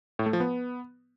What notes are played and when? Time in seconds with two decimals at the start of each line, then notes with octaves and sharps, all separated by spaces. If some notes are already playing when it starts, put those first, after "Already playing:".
0.19 A2
0.26 A3
0.33 F3
0.40 B3